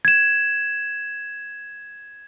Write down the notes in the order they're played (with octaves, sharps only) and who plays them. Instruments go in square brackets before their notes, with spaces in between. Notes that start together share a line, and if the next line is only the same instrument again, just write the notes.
[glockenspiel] G#6 E7